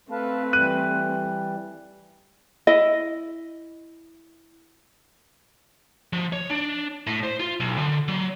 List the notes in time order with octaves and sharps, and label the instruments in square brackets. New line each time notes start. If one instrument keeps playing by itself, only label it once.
[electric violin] A3 C4 [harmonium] A4 F5 A5 [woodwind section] B4
[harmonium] E3 G3 [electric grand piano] F#6 D#7
[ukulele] E4 D#5
[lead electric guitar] F3
C#5
D4
A2
C5
F4
B1
D3
F#3